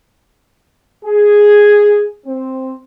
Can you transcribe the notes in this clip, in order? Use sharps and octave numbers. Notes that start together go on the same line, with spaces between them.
G#4
C4